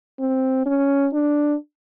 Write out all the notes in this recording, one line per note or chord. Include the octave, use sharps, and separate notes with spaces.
C4
C#4
D4